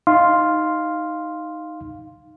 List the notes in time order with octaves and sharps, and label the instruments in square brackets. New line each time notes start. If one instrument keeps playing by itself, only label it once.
[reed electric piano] D#4 F5 C6